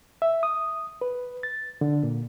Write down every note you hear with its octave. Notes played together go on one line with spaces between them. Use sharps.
E5
D#6
B4
A6
D3
A#2